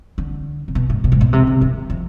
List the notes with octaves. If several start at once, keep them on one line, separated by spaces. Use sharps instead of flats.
D3
C3
B2
G#2
B2
G#2
B2
C3
D3
D#3
F3